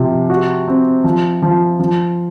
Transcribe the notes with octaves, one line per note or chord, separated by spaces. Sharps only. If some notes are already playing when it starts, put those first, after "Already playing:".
Already playing: C3 F3
F#4
C4
F3
F3
F3